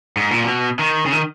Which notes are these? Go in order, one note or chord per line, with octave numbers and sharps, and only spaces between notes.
G#2
A#2
B2
D#3
C#3
D#3